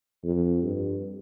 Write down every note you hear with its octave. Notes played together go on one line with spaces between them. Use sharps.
F2
G2